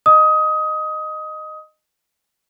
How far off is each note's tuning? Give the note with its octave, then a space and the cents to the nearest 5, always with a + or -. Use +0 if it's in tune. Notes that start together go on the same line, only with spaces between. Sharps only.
D#5 -15 D#6 +20